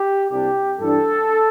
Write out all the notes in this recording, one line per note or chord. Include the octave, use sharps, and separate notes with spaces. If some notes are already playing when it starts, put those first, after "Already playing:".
Already playing: G4
C2 C3 G3 D4 G4
G2 E3 G3 D4 A4